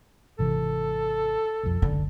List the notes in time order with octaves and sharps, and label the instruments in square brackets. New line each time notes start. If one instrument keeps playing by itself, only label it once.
[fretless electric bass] G#1 C3 E3 [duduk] A4
[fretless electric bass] B1 F2
[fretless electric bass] F#1 C#2 [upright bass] D3